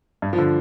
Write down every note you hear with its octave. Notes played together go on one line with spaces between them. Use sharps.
G2
F3
D3